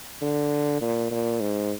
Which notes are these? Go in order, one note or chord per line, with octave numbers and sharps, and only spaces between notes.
D3
A#2
A#2
G#2